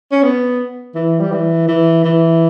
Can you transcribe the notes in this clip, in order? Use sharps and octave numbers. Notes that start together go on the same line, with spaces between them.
C#4
B3
E3
G3
E3
E3
E3